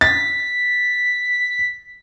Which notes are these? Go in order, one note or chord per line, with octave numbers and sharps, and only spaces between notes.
A6 B6